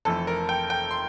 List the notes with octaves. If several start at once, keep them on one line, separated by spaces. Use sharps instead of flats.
F1 F2 E3 A3 A4
A#4
G5
G5
C6